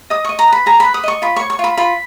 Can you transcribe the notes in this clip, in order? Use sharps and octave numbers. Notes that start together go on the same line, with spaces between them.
D#5 D#6
D#5 C#6
A#5
B4 B5
G#4 A#5
B4 B5
D#6
D#5 C#6
F4 B5
C#6
C#5
C#6
F4 B5
F4 B5